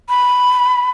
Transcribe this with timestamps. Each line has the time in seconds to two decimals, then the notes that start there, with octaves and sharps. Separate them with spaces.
0.09 B5